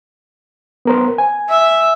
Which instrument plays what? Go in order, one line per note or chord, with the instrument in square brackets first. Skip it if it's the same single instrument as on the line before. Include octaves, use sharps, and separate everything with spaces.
[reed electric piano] B3 A#4 C5
G#5
[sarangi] E5